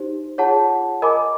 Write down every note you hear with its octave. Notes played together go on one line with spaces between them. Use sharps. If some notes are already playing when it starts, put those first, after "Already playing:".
Already playing: D#4 G4 C5
F4 G#4 C#5 F#5 A5
A#4 D#5 G#5 B5 D6